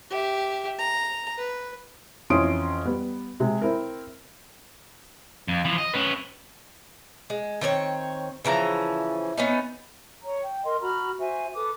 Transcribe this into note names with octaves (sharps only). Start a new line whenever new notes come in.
G4 E5
A#5
B4
F2 E3 C#4 C6 D#6 D7
G3 B3
C3 G#3
C4 E4 A#4
F2
E3 F3
D#5
C#4 B4
G#3
D#3 C4 D4 C#5
C#3 E3 F3 A#5
B3 C#4 D#4
C#5 A#5
G5
A#4 D#5 C6
F#4 A#5 B5 F6
F#4 C5 E5 G#5
A4 B4 D6 D#6